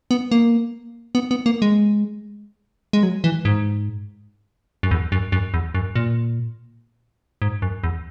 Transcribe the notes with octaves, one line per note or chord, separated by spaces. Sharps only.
B3
A#3
B3
B3
A#3
G#3
G#3
F#3
E3
G#2
F#2
E2
F#2
F#2
E2
F#2
A#2
G#2
F#2
E2